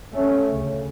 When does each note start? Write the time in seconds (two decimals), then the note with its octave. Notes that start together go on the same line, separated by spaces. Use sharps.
0.13 A3 C#4
0.49 D2 C#3